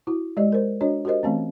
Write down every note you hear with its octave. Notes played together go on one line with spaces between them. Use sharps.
E4 F#4
G#3 G4 D5 D#5
A#4 C5
D4 F#4 C#5 D#5
F#4 G4 A#4 C5 D#5
E3 A3 C4 C#4